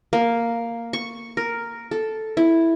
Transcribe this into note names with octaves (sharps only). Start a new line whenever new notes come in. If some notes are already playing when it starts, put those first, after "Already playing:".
A#3
C#6
A#4
A4
E4